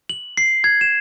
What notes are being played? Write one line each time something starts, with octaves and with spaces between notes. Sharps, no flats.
F#7
C7
G#6
E7